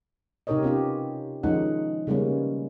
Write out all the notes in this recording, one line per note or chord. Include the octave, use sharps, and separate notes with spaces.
C3 D#4 G4 A#4 C#5 D#5
B3 C#4 F4 G4
D#3 F3 G#3 C#4 D#4 F#5
C#3 G3 G#3 A#3 B3 C#4